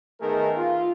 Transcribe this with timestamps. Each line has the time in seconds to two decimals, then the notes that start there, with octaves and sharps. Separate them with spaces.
0.21 D#3 A3 B3 D#4 G#4 A#4
0.57 F4